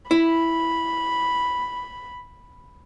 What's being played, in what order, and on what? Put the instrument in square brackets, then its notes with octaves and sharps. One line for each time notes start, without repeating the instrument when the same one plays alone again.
[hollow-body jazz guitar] E4 [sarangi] B5